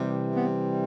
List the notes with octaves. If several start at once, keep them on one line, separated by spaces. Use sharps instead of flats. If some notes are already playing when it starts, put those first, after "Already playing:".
Already playing: C3 E3 G3
B3